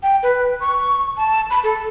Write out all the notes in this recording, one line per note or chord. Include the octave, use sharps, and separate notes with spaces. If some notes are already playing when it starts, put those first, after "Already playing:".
G5
B4
C#6
A5
B5
A4